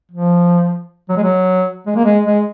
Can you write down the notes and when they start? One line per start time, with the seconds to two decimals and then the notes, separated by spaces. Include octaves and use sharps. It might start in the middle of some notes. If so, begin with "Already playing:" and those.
0.12 F3
1.09 F#3
1.17 G#3
1.23 F#3
1.87 G#3
1.96 A#3
2.05 G#3
2.25 G#3